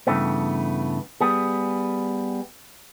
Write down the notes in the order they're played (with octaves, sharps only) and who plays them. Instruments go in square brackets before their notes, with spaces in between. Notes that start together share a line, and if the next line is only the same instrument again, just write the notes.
[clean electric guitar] G2 C#3 E3 A3 B3
G3 B3 G#4